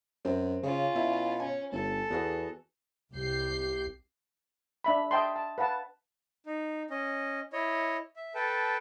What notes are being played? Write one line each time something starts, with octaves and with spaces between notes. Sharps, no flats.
F#2 C4
C#3 C#4 F4
B2 E4
C#4 C#5 G#5
G1 A4
E2 B3 F#4 G#4
C2 G4 G6 C7
D4 E5 B5
D#5 E5 G5 A5 C6
A5
B4 F5 F#5 A5
D#4
C#4 D#5
E4 C#5 D#5
E5
A4 B4 G5 A5